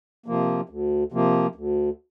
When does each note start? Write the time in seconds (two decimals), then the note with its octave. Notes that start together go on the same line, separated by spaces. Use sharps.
0.26 C3 F3 A#3
0.69 D2
1.12 C3 F3 A#3
1.55 D2